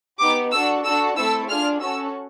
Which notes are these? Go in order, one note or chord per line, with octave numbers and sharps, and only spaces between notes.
B3 D#4 G4 D6
D4 F#4 A4 E6
D4 F#4 A4 E6
A3 C4 E4 A4 E6
D4 F4 G#4 F6
C#4 F#4 A4 E6